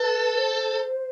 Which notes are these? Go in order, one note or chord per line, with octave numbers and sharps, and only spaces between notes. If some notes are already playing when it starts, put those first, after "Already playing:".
Already playing: A4 B4
C5